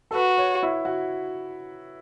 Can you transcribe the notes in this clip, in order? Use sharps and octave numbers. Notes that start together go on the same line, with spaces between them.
A4
F#4 B4
C#5
E4
F#4